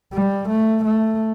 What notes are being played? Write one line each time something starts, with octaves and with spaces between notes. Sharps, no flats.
G3
A3
A3